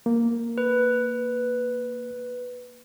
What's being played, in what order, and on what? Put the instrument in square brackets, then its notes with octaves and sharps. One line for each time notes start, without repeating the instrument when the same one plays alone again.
[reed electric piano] A#3
[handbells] B4